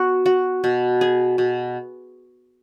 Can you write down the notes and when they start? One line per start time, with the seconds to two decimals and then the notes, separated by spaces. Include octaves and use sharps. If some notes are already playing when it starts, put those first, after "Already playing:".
Already playing: B3 F#4
0.26 F#4
0.64 B2
1.01 G#4
1.38 B2